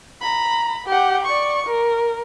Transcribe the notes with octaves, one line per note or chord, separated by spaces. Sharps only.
A#5 B5
G4 F#5
D5 C#6
A#4